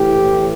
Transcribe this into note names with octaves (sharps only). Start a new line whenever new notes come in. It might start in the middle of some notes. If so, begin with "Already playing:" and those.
Already playing: A2 E3 G4